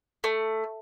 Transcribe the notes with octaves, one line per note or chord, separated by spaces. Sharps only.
A3